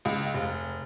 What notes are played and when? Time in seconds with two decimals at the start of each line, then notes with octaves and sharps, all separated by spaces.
0.05 C#2
0.34 F1